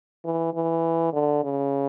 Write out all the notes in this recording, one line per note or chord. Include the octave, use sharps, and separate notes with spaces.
E3
E3
D3
C#3